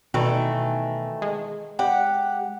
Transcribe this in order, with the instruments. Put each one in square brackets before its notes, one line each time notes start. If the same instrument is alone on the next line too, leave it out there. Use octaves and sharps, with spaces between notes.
[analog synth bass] B2 [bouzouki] D#3 E3 A3
[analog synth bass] G#3
[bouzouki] G4 F#5